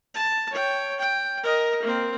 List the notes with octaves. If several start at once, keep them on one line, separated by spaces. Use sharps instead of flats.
A5
C#5 G5
G5
A#4 D#5
A#3 C4